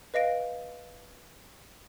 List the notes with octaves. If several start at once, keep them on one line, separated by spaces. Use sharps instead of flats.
B4 D#5 F5 A#6 D7